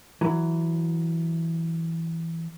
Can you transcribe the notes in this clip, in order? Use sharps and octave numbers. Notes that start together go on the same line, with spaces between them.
E3 F#3